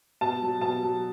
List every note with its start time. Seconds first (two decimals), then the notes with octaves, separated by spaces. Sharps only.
0.21 B2 A5
0.42 F#3
0.61 B2 A5
0.82 F#3